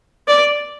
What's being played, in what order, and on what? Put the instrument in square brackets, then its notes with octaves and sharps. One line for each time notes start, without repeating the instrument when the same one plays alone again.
[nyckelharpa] D5